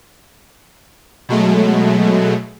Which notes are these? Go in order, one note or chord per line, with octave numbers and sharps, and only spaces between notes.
B2 F#3 G#3 A3